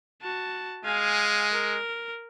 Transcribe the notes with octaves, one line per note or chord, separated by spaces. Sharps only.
F#4 A5
G#3 F5 G#5
A#4